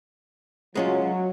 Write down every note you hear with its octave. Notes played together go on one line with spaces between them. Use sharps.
F#3 G#3 C#4 F4